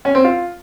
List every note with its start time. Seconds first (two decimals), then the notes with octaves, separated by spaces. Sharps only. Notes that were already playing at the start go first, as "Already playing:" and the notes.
0.05 C#4
0.15 C4
0.24 F4